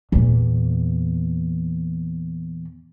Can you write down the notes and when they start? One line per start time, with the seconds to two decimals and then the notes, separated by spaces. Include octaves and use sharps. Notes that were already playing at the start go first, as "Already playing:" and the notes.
0.12 E2 A#2